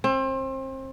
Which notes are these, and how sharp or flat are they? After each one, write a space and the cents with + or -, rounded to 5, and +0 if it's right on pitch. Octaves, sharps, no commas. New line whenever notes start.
C4 +30